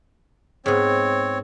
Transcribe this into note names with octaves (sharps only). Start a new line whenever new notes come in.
G#2 B3 C4 C#5